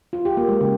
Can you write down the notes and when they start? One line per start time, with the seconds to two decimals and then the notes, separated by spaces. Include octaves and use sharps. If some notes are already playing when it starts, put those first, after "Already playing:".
0.13 F4
0.25 G4
0.37 A#3
0.49 G#3
0.61 C#3